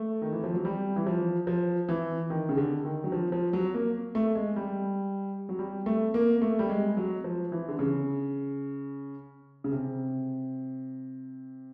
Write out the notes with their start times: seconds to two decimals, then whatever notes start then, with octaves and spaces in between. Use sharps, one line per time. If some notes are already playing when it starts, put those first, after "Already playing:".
Already playing: A3
0.22 D#3
0.33 E3
0.44 F3
0.54 F#3
0.65 G3
0.96 E3
1.07 F3
1.47 F3
1.89 E3
2.30 D#3
2.49 C#3
2.57 D3
2.85 D#3
3.04 F#3
3.12 F3
3.32 F3
3.53 F#3
3.74 A#3
4.15 A3
4.35 G#3
4.56 G3
5.49 F#3
5.59 G3
5.86 A3
6.14 A#3
6.42 A3
6.59 G3
6.70 G#3
6.97 F#3
7.24 F3
7.52 E3
7.69 D3
7.79 C#3
9.64 C#3
9.72 C3